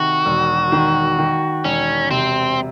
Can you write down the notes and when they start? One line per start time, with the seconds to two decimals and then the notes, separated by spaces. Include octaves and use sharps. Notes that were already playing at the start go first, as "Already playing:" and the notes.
Already playing: C3 D#3 F#4
0.25 E1
0.72 D#3
1.19 D#3
1.64 E1 C#4
2.11 C3 C4